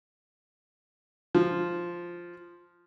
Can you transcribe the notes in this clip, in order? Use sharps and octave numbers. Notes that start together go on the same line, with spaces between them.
F3